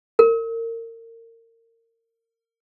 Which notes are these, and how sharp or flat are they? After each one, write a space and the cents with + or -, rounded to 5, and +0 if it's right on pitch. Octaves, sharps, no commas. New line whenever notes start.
A#4 -30